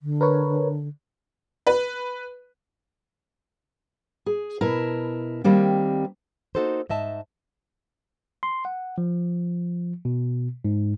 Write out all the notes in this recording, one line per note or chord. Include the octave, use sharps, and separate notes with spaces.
D3
A#4 B4 C#5
B4
G#4
B2 E4 A#4 A5
D#3 G3 A#3 C4
A#3 D#4 F#4 A4 A#4 C5
G#2 D#5 E5 A5
C6
F#5
F3
B2
G#2